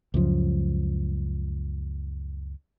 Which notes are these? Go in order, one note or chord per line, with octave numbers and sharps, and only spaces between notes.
C#2 F#2 F3